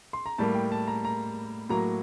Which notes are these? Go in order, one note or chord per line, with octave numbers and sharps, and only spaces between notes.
C6
A#5
A2 G3 A#3 A5
G5
A5
A#5
A#5
A2 F#3 A#3 A#5